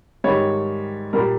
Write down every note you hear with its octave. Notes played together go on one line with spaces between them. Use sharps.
G#2 D#3 G3 C#5
A#2 G3 A#4